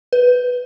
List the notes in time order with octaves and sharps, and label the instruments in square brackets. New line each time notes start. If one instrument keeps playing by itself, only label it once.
[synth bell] B4